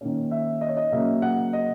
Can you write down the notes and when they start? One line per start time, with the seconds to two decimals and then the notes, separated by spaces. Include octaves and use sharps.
0.01 D#3 A#3 C#4
0.31 E5
0.61 D#5
0.68 C#5
0.77 D#5
0.91 C#3 F#3 A#3 C#4 E5
1.22 F#5
1.53 D#5